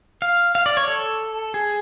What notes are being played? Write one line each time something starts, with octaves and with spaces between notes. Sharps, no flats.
F5
F5
D5
C#5
A4
G#4